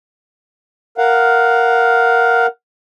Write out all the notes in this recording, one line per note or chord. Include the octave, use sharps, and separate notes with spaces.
A#4 F5 F#5